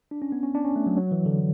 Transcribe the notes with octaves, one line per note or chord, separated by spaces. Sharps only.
D4
C#4
B3
C#4
D4
C#4
A3
F#3
F#3
E3
D3